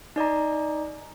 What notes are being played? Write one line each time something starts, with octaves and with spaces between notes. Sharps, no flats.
D#4 D5 D#5 A#5